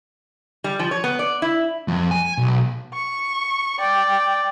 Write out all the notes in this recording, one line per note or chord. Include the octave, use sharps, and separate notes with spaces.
G3
F3
C#5
B3
D5
E4
F2
G#5
B1
C#6
D5 G5